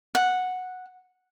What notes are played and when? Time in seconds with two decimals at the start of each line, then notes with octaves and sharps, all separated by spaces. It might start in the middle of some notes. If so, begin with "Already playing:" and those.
0.15 F#5